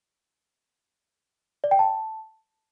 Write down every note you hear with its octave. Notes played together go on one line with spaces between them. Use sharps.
D5
G5
A5